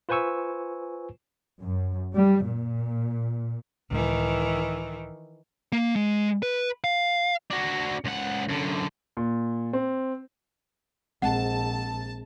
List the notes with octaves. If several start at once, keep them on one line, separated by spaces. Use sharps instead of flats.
F4 B4 C5 G#5 C#6 E6
F#2
G3
A#2
C#2 A2 D#3 E3 G#3
A#3
G#3
B4
F5
D4 F#4
C#2 F#5
F#2 D3
A#2
C4
A#1 G#3 C4 F#5 A5